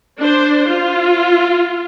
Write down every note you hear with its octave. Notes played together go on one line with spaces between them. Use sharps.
D4 C5
F4